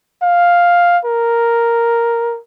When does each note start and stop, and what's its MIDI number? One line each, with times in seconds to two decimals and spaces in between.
0.22 0.98 77
1.05 2.39 70